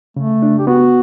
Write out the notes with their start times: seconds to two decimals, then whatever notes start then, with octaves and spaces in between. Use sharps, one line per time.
0.17 C#3 A3
0.42 D4
0.59 G4
0.67 B3 F#4